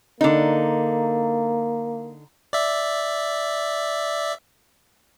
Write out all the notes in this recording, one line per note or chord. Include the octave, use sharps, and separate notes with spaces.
D3 A#3 D#4
D5 E5